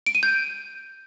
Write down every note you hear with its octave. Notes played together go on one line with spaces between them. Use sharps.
D7
D#7
G6